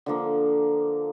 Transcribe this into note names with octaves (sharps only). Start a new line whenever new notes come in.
D3 F3 A#3